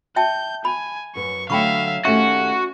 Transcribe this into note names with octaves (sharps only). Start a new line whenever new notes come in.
E5 G5 A5 G6
G#5 B5
F#2 B4 C#6
D3 F#3 A3 E5 F5 G5 B5 C#6
D#2 A3 C#4 F#4 G4 E5 C#6